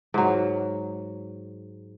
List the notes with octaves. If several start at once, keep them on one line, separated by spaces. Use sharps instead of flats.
G#2 F#3